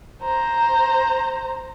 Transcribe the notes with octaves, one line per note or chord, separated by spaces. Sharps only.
C5 A#5